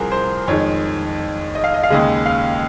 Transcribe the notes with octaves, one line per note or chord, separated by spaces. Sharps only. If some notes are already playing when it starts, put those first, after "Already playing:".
Already playing: C2 C3 F3 G#4 A#4 C5
C5
F2 D#3 G#3 C#5
D#5
F5
D#5
F5
D#2 C#3 G#3 D#5
F5